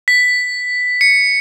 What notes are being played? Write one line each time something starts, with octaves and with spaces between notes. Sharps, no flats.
B6
C#7